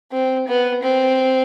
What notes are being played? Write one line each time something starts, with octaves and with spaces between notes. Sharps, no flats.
C4
B3
C4